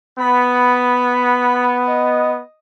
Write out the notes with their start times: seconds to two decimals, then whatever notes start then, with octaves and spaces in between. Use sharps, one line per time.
0.19 B3 B5
1.87 D#5